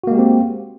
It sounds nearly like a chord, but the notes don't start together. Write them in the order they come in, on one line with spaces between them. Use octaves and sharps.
F#4 A#3 G#3 G4 C4